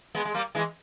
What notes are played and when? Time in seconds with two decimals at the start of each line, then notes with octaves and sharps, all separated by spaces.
0.15 G#3 B3
0.25 G#3
0.34 G3 A#3
0.55 E3 G#3